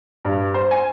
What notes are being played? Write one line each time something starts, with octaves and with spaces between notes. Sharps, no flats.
G2
C5
G#5